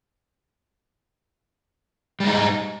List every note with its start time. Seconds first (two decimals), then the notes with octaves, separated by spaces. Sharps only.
2.20 G3
2.24 G#3
2.27 D#4